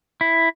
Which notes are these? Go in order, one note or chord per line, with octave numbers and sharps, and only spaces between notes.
E4